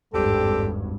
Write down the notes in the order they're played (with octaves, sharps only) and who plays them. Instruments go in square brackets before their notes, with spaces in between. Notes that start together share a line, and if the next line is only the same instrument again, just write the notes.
[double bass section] G#1 G2 [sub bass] E2 [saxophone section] C4 D4 G4 [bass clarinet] A4